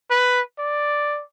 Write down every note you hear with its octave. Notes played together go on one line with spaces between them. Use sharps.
B4
D5